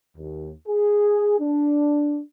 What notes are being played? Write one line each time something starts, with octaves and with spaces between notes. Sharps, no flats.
D#2
G#4
D4